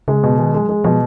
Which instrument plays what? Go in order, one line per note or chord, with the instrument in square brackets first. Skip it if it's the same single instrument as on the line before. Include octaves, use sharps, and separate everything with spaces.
[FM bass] C#3 [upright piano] G#3
[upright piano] B2
[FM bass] D#3 [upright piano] G#3
[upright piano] G#3
[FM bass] F#3
[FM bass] F3 [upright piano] G#3
[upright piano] B2 [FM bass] F3